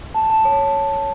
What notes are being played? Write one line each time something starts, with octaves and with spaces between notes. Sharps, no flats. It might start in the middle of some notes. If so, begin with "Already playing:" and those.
A5
A5
C#5